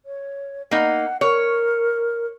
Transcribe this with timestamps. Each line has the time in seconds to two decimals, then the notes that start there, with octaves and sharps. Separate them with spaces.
0.06 C#5
0.71 A#3 D#4 F#5
1.21 A#4 C#5